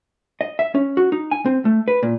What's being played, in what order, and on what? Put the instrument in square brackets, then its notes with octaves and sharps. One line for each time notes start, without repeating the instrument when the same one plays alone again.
[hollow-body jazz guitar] D#5
E5
C#4
F#4
D#4
G#5
C4
A3
B4
A#2